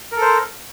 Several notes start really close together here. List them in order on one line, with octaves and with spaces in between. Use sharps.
A#4 A4 C5